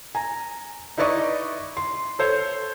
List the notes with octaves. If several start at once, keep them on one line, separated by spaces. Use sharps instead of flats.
G#5 A#5
D#4 E4 B4 D5 D#5 C#6
C6
A4 C5 C#5